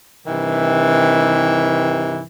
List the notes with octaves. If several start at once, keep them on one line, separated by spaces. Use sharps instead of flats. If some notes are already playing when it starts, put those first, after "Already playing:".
G2 C3 D#3 E3